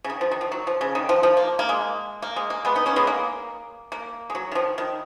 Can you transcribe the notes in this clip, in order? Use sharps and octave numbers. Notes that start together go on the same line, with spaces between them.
C#3
D#3
F3
D#3
F3
F#3
F3
C#3
D#3
F3
F3
A#3
A#3
G#3
A#3
G#3
A#3
G#3 B3
B3 D#4
A#3 C#4
G#3 B3
A#3
A#3
G#3
F#3
D#3
F3
D#3